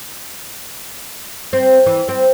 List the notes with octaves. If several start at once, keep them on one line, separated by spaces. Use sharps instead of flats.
C4
E3
C4